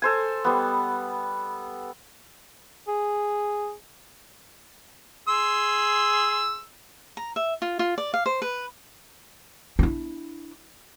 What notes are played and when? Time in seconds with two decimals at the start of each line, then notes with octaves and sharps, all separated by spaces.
0.02 A4 C5 G#5
0.44 G3 B3
2.88 G#4
5.28 G#4 C6 E6
7.17 A#5
7.36 E5
7.62 F4
7.79 F4
7.98 D5
8.14 F5
8.26 C5
8.42 B4
9.79 D4 E4